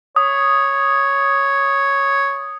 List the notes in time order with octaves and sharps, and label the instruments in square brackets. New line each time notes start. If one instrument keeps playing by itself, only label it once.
[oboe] C#5 [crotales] D#6